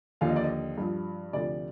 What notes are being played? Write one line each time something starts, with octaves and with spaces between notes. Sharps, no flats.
D#2 D3 F3 F5
D#5
D5
D#5
G2 F3
D2 C3 F3 D5